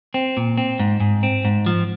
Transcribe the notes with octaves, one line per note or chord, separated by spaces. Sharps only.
C4
A#2
C4
G#2
G#2
C4
G#2
F3